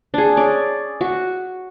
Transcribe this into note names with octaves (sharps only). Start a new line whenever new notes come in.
D4 G#4
C#4 D5
F#4